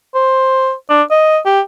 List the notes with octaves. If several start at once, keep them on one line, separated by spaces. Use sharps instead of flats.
C5
D4
D#5
G4